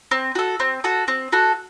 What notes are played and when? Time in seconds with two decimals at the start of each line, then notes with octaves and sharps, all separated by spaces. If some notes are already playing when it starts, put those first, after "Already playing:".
0.11 C4
0.35 F#4 A4
0.60 C4
0.84 F#4 A4
1.08 C4
1.32 F#4 A4